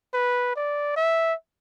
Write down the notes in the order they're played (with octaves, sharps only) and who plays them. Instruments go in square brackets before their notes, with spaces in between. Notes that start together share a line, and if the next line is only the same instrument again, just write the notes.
[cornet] B4
D5
E5